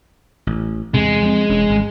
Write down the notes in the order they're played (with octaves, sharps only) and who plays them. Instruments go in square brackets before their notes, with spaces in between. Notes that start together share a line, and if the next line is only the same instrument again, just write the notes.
[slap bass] A1
[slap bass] E2 C3 [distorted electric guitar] G#3
[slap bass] F3 C4
E1 C#4
G#1